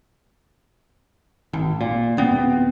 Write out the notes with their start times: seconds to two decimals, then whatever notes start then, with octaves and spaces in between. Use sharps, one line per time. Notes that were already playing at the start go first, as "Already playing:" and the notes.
1.53 G#1
1.81 A#2
2.17 D1 B3 C4